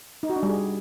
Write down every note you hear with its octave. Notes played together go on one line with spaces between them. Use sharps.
D#4
F#4
D4
G3
G#4